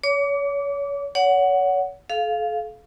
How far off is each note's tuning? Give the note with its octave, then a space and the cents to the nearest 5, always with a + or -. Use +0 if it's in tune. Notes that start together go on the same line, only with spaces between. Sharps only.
C#5 +30 D6 -25
C#5 +35 F#5 +0
A4 -40 F5 +0